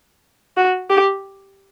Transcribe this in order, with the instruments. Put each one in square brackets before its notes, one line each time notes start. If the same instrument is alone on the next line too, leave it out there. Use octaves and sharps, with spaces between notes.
[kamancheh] F#4
G4